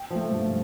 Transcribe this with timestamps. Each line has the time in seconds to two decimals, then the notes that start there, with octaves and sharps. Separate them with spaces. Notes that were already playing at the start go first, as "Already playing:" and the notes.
Already playing: G5
0.10 F3 A3
0.31 G2